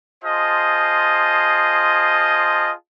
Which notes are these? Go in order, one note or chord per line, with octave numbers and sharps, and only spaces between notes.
F4 G#4 C5 D#5 A5